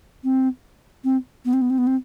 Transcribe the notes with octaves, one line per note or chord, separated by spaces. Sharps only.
C4
C4
B3
C4
B3
C4
B3
C4